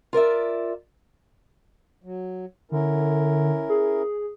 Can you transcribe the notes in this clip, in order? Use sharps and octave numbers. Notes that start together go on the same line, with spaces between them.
F4 A#4 D5 E5
F#3
D3 C#4 E4 A#4
G#4